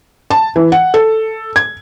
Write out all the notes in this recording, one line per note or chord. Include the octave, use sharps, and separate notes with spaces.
A5
E3
F#5
A4
G#6